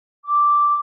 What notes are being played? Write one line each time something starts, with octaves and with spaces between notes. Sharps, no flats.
D6